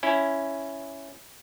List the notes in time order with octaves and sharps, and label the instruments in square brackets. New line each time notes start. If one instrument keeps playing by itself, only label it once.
[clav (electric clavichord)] C#4 E4